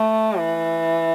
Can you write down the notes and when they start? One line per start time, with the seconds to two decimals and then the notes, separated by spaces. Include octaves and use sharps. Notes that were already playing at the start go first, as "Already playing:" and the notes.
Already playing: A3
0.38 E3